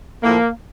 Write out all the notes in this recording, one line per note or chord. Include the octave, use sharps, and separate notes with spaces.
A2 F3 A#3